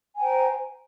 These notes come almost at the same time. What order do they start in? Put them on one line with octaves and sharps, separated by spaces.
G#5 G5 C5 A#5